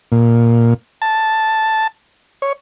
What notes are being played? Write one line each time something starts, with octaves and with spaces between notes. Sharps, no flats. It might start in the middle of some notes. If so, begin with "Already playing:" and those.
A#2
A5
C#5